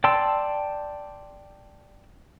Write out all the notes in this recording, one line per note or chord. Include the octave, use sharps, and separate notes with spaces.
D5 G5 A5 C6 E6